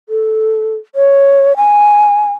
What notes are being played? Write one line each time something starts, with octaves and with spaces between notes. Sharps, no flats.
A4
C#5
G#5